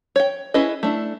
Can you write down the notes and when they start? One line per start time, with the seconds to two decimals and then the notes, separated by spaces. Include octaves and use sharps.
0.16 C#5 G5
0.54 C#4 E4 G#4 B4 D#5
0.83 A3 D4 E4